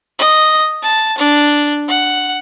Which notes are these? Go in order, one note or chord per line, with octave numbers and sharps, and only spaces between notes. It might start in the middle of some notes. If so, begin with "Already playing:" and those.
D#5
A5
D4
F#5